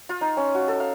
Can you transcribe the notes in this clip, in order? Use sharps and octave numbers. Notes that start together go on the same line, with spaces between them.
F4
D#4
C#4
F#4
A4
F5